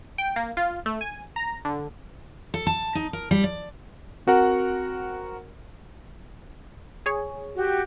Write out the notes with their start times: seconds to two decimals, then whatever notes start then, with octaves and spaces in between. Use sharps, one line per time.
0.18 G5
0.36 A#3
0.57 F4
0.86 A3
1.01 G#5
1.36 A#5
1.65 D3
2.54 A4
2.67 A5
2.95 D#4
3.13 A#4
3.31 G3
3.44 D5
4.27 C4 F#4 A#4 F#5
7.06 G#4 C#5
7.55 F#4 G4